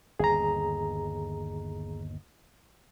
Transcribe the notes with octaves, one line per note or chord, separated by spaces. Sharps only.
G1 D#2 G#4 A#5